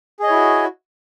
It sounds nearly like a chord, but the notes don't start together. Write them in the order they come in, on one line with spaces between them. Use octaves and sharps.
G#4 D#5 C#5 E4 F#4